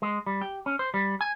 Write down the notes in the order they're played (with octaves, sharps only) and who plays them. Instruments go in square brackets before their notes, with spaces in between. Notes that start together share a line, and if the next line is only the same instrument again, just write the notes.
[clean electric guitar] G#3
G3
G4
C#4
C5
G3
G#5